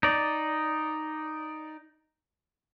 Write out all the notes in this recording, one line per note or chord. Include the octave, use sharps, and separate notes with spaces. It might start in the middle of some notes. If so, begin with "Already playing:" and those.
D#4 D5